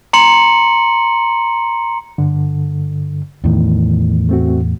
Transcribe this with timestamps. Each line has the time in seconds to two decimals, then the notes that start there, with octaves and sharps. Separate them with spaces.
0.13 A#5 C6 C#7 F#7
2.18 G2 D3
3.44 E2 A2 D#3
4.29 A3 C4 F#4